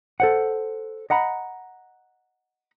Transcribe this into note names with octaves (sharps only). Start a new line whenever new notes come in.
A4 C5 F#5
D#5 F#5 A#5 B5